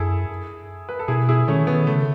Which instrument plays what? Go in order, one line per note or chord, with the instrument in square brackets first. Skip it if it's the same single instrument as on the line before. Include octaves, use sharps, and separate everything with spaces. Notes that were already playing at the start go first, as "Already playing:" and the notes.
Already playing: [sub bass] F#2 [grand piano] E4 G#4 A4
[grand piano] B4
A4
[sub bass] B2 [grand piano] E4 G#4
[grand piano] E4 G#4
[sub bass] D#3 [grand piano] A3 C#4
[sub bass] D#3 [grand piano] B3
[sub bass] C#3 [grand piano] A3